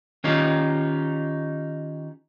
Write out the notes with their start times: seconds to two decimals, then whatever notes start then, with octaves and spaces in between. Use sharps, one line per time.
0.24 D#3 C#4 D#4 F4 G4